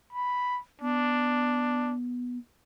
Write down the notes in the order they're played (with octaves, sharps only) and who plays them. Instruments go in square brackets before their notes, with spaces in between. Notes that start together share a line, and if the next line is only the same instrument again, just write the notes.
[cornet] B5
[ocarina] B3 [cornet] D4